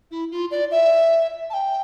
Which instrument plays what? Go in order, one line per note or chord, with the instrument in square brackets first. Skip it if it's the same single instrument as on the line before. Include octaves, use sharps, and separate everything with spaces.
[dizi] E4
F4
D5
E5
A5
G5